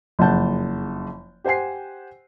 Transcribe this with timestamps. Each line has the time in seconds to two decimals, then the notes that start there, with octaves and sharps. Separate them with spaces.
0.19 F#1 F2 C#3 F#5 A5 G6
1.44 G4 C5 F#5 G#5 C7